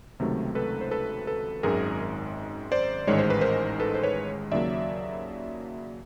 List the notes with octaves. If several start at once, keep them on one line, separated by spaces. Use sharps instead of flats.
C#2 C3 D#3 F#3 A3
A4 B4
C5
A4 B4
A4 B4
G#1 F#2 D#3 G#3 G#4 A#4
C5 D5
A1 G#2 D#3 G#3 C#5
C5
B4
A#4 C5
A4 B4
C5
B4 C#5
D#2 C#3 F#3 A#3 D5 E5